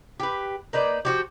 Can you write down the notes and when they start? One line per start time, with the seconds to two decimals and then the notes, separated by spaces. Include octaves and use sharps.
0.20 G4 B4
0.73 A#3 D#4 B4 D5
1.05 F3 F#4 G4